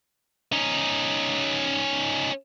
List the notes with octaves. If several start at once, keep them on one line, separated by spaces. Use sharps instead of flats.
C#4 D#4